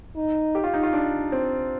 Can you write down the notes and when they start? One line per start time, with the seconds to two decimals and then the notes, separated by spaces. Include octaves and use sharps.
0.16 D#4
0.55 G4
0.64 F4
0.74 D#4
0.83 F4
0.93 D4
1.32 C4